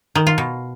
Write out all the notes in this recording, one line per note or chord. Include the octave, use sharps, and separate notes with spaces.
D#3
F4
B2